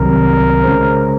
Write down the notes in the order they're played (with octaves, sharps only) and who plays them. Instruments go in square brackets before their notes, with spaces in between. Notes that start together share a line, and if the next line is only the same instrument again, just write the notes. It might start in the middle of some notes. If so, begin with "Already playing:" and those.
Already playing: [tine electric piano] C2 C3 D#3 F#3 C4 [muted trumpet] A#4
[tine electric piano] C#3 G#3 C#4 G#4 C5